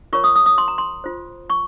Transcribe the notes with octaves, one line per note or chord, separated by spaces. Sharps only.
F4 A#4 C#5 C#6
D#6
D#6
D#6
C6
A#5
C6
F4 C5
C#6